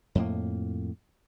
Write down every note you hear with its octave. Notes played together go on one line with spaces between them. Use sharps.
F2 A2 A#3